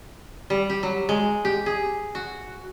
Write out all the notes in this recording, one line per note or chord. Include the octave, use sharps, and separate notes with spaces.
G3
G4
F#3
G#3
G4
G#4
F#4